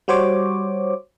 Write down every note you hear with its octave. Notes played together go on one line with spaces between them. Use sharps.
G3 F#4 C5 C#5 D6